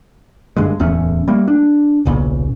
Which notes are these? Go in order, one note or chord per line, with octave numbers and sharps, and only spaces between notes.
F#1 G2 D3 G#3
D1 E2 A3 C#4
G3 A3 A#3
D4
D#1 B1 A#2 C#3